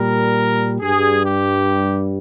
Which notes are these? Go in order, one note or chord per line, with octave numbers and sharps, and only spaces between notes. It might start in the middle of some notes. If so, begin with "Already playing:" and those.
Already playing: A#2 G3 A#4
G2 G3 G#4
G4